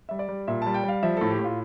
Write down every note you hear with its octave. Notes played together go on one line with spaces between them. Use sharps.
G3 E5
D5
G3
A#2 E5
G3 A5
G5
G3 F5
F3 E5
A2 A4
G4
A2
F4